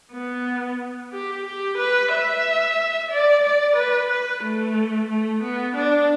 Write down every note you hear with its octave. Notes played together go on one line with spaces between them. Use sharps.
B3
G4
G4
B4
E5
D5
D5
B4
B4
A3
A3
B3
D4